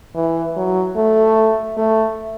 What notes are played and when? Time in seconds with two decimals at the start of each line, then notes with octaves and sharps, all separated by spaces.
0.15 E3
0.57 F#3
0.96 A3
1.77 A3